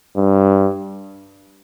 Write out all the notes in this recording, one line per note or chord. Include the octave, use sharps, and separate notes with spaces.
G2